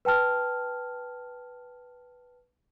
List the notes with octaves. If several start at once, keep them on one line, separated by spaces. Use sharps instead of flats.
B4 G5 A5 F6